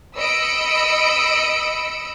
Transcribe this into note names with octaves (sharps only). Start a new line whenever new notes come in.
D#5 B5 E6 C#7 D7